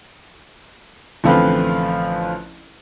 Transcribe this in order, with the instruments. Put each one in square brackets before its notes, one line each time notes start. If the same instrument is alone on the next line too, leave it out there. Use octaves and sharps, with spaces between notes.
[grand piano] A1 D3 F3 C4 F4 B4